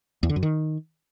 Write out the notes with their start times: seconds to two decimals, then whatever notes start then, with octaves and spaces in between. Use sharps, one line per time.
0.23 E2
0.29 D3
0.36 F#2
0.43 D#3